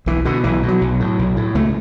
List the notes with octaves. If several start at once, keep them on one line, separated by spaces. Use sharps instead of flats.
B1 E3
B2 D3
B1 E3
B2
F#3
B1
A2
B1
A2
C#2 A3